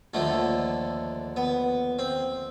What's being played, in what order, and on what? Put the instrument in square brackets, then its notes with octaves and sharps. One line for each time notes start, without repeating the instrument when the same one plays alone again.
[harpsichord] D#2 D3 F3 A3
B3
C4